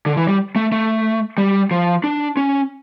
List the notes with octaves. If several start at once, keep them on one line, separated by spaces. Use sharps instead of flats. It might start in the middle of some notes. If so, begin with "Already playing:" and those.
D3
E3
G3
A3
A3
G3
F3
D4
C#4